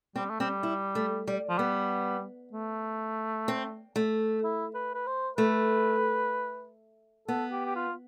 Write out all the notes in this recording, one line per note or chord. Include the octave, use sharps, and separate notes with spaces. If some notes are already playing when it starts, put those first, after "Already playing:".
G3 C4
A3
G3 C4
E4
A3
G3
F3
G3 B3
A3
C4
A3
E4
B4
B4
C5
A3 B4
B3 A4
G4
G4
F4